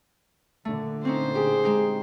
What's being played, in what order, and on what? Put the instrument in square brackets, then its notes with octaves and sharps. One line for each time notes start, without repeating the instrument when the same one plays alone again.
[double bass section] A#2 D3 [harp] A3
[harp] C4 C#4 D#4 [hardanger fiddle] C5
[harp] G4 G5 [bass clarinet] G#4
[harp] G#3 D#4 G5